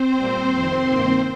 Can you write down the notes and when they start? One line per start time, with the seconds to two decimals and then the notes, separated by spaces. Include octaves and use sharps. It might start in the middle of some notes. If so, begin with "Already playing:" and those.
Already playing: C4 C5
0.15 A#2 G3 A#3
0.51 F2 C3 D#3
0.88 G2 D#3 A#3